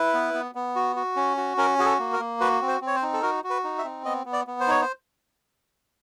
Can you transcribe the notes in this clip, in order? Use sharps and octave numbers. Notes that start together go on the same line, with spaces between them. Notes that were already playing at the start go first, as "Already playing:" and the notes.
Already playing: E4 B4
B3
B3
B3
F#4
F#4
C#4
F#4
C#4 A#4
F#4 G#4
A4
A#3
A#4
A#3
F#4 B4
C4
C5
C4
C#5
C5
D#4
A4
F#4 A#4
F#4
B4
D#4
E5
C4
B3 D#5
B3
D5
B3
C5
D#4 C#5
C5